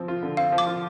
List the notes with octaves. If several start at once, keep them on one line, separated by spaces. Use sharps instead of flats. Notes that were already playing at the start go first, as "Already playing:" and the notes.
Already playing: F3 C4
F4
D3
C4 F5
F3
D6
F4